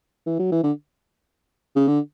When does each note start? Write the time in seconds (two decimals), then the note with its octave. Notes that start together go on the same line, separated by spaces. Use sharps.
0.27 E3
0.39 F#3
0.52 E3
0.63 D3
1.76 C#3
1.88 D3